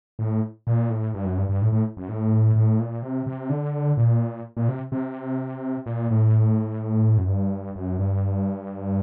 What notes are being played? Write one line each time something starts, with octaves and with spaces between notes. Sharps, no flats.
A2
A#2
A2
G2
F#2
G2
G2
A2
A2
F#2
A2
A2
A#2
C3
C3
D3
A#2
A#2
C3
C3
A#2
A2
F#2
G2
F#2
G2